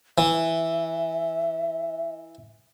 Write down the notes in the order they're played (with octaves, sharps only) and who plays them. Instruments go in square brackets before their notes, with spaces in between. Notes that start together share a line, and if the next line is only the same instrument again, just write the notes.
[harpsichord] E3 [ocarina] E5